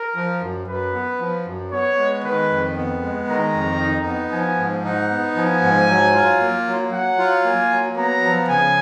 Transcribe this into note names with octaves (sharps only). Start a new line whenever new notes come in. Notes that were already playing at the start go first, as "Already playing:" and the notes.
Already playing: A#4
F3
F#2
F#2 B4
B3
F3
F#2
B3 C#5
G#3
D#3 B4
F2
B3
G#3
D#3 A#5
F2
D#4
B3
F3 G#5
G#2
D#4 F#5
B3
F3 G#5
G#2
F#3
F4
A#3
F#3
F#3 F#5
F4
A#3 G#5
F#3
B3 A#5
F3
C#3 G#5